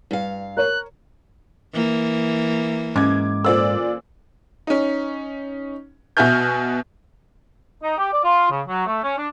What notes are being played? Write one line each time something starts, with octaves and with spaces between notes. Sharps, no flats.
G2 F5
A#4 C#5 F#6
E3 A#3
G#2 C#4 D6 G#6
A#2 A4 C5 D5 E6
C#4 D#4
B2 F#4 E5 G#5 F6 G6
D#4
G4
D5
F4
C#3
F#3
A3
C#4
D4